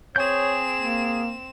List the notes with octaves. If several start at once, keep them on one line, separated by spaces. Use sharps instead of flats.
C4 G#4 C#5 G#5 G6 E7
A#3